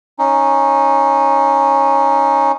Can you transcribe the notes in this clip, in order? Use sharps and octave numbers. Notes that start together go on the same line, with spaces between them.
C#4 D#4